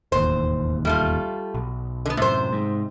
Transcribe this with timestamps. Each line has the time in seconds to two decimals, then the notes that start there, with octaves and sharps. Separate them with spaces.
0.12 E1 A1 D#2 C5
0.85 G3 A3 F4
1.55 B1
2.06 D3 B3
2.17 F#2 A2 C3 C5
2.53 G#2